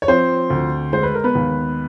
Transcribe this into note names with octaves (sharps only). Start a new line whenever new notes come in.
C#5
F3 C4 C5
D2
G#3 C5
B4
A#4
B3 B4
D#2